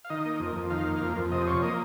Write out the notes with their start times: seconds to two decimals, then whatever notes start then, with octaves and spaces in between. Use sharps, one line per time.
0.05 F5
0.10 D#3 D#5
0.25 A#3
0.40 F2
0.55 F2
0.70 D#3 F5
0.85 A#3
1.01 F2
1.17 F2
1.32 C3 D#5
1.47 F3 C#5
1.62 A#3 D#5